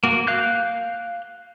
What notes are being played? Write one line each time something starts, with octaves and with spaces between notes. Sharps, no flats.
A#3 F#4
F5 F#6 G6